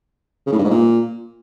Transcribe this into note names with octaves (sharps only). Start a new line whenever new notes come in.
C#3
A2
G2
G#2
A#2